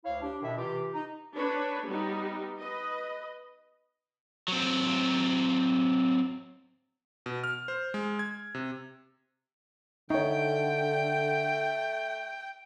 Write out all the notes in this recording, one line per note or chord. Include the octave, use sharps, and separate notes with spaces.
D2 E4 C#5 F5
D4 G4
B2 D#3 D4 E4 E5
C3 E3 F4 G4
D#4
D4 B4 C#5
G3 B3 D#4
B4 D#5
F#3 C4
B2
F6
C5
G#3
G#6
C3
D3 A3 D#4 C#5 G5